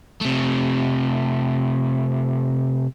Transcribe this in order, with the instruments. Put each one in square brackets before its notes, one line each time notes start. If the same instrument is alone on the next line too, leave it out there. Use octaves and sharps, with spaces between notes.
[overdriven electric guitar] C3 A3